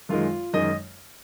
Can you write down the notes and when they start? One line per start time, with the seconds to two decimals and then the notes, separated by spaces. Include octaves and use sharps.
0.09 F#2 D#3 G#3 F4
0.53 F#2 D#3 G#3 D#5